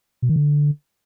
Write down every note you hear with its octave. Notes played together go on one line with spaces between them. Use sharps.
B2
D#3
D3